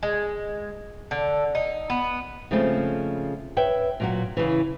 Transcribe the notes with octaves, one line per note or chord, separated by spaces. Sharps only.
G#3
D3
D#4
B3
C#3 F3 G#3 A3 C4
B4 C#5 E5 G5
A#2 F#3 F#4
C#3 E3